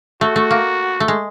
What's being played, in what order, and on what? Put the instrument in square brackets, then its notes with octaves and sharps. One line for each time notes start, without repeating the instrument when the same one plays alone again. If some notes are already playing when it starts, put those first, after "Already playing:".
[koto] A3 [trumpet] F#4
[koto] A3
A#3
A3
G#3